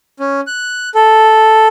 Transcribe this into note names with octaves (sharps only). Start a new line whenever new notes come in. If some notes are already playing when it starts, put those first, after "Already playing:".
C#4
F#6
A4